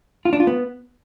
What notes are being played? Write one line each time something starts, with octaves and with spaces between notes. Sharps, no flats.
F4
D4
F4
B3